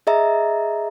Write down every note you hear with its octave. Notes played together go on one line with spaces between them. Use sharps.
G#4 D#5 E5 A#5